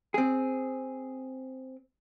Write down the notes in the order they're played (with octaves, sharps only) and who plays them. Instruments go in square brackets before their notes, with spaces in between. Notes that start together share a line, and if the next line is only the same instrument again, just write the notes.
[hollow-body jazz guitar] C4 G#4